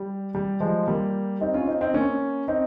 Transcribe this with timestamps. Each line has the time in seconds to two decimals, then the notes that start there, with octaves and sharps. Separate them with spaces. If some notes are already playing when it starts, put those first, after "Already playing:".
Already playing: G3
0.35 G3
0.60 F3 G#3
0.88 G3 A#3
1.41 C4 D#4
1.54 C#4 F4
1.67 C4 D#4
1.81 C4 D#4
1.94 A#3 C#4
2.48 C4 D#4